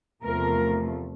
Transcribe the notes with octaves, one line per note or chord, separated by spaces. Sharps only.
E2 C3 F3 A3 A#4